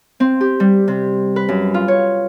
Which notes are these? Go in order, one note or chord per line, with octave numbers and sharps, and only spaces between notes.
C4
G4
G3
C3
B4
F#2
F4
C#5